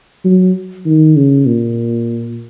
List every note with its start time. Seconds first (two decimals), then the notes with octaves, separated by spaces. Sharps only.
0.25 F#3
0.86 D#3
1.16 C#3
1.46 A#2